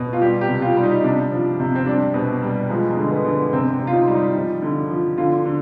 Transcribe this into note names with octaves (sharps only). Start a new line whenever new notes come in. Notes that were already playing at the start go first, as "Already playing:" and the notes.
Already playing: B2
F4
G3 G4
G4
C3
F4
G3
D#4
C3 D4
F3
C3
C4
G3 D4
B2
G3
F3 G#3
G#3
D3
B3
D3
B3
C3 C4
C3
F4
D#4
G3
D#4
F3
D3
F3
D3 F4
D3